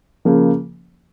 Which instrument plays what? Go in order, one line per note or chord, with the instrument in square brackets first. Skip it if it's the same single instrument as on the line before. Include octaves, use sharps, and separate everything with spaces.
[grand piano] C#3 F3 A#3